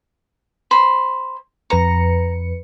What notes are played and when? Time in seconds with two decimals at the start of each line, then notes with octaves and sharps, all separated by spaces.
0.71 C5 B5
1.70 F2 B4 A#5 C#7